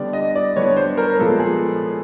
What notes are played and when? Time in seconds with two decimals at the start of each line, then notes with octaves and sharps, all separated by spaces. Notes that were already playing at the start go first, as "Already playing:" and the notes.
Already playing: D3 G3 B3 D5
0.13 D#5
0.35 D5
0.56 D3 G3 B3 C#5
0.77 C5
0.97 A#4
1.19 A#2 F3 G#3 B3 A4
1.39 G#4